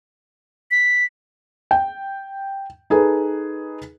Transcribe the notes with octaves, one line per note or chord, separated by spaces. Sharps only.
B6
G5
D#4 G#4 A4 B4